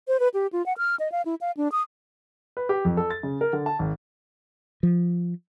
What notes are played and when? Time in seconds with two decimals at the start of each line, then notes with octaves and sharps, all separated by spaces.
0.08 C5
0.20 B4
0.34 G4
0.53 F4
0.66 F#5
0.78 F6
1.00 D#5
1.12 F5
1.25 E4
1.41 F5
1.57 D4
1.72 D#6
2.57 B4
2.69 G4
2.85 F2
2.97 A4
3.10 A6
3.23 C#3
3.41 A#4
3.53 D3
3.66 A5
3.79 G#1
4.83 F3